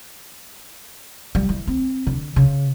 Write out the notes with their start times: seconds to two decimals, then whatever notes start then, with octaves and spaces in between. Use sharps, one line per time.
1.35 G3
1.49 E3
1.67 C4
2.07 D3
2.36 C#3